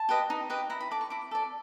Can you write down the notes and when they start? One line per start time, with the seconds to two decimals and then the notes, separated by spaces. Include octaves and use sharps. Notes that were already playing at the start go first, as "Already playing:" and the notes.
Already playing: A5
0.09 G4 B4 D#5
0.30 D#4
0.50 G4 B4 D#5
0.70 E4 A#5
0.81 B5
0.91 A4 D5 D6
1.01 C#6
1.10 E4 D6
1.31 A4 D5